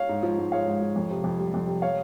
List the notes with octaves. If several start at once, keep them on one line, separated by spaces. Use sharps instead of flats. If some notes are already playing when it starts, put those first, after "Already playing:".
Already playing: C#5 F5
G#2
F3
G#2
G#3 C#5 F5
G#2
F3
F2
C3
F2
G3
F2
C3
C#5 F5